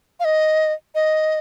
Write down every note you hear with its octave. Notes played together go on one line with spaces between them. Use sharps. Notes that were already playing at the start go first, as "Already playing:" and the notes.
F5
D#5
D#5